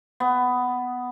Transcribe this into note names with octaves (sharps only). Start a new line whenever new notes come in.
B3